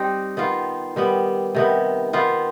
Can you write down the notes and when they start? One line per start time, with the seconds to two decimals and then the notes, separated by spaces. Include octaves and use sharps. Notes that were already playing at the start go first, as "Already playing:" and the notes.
Already playing: G3 C4 D#4
0.37 D#3 B3 F4
0.96 D#3 G3 B3
1.55 C3 D#3 B3
2.13 D#3 B3 F4